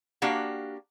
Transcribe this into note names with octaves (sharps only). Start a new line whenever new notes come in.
A#3 D4 F#4 G4 F5 F#5